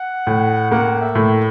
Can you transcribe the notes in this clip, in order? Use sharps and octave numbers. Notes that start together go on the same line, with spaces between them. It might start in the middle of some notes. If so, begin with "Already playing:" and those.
Already playing: F#5
A2
A#3 F#5
E5
A2